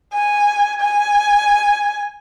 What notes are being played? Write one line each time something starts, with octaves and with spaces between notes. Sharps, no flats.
G#5
G#5